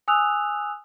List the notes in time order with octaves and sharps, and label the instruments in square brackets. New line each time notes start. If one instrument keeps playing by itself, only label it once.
[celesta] G#5 D#6 E6 F#6 F7